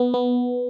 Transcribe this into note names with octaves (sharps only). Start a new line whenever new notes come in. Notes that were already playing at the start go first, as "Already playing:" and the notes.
Already playing: B3
B3